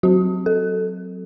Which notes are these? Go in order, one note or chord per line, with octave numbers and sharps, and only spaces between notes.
F#3 C4 F#4
A4